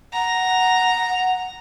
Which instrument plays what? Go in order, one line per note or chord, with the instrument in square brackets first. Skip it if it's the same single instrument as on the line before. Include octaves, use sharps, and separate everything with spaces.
[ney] F#5 [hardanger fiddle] A#5